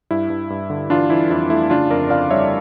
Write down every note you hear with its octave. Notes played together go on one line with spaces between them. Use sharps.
G2 E4
G2
G2
D3
E3 D4 F4
E3 E4
F2 E4
A3 E4
C#3 D4 F4
F2 A#4 D5
F2 D5 F5
G3 C#5 E5